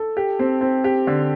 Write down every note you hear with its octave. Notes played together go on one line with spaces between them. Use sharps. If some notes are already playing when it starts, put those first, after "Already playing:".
Already playing: A4
G4
C4
C4
G4
D3